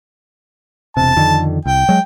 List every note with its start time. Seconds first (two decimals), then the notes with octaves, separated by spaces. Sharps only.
0.97 E1 C3 A5
1.16 F2 D3 D#3
1.66 C2 G5
1.89 F#3 G#3